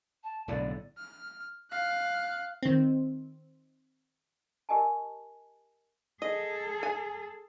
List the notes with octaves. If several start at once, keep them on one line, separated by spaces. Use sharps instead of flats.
A5
B1 A2 D3 D5
F6
F5 F#6
D#3 C4
G4 A#4 D#5 G#5 A5
G#4 A4 D#5
G#5